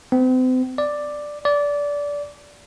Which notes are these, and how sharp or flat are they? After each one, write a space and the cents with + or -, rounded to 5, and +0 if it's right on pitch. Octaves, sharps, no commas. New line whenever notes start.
C4 -40
D5 +5
D5 -20